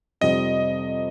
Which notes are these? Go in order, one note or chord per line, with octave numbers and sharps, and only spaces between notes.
F2 C3 G3 C4 D#5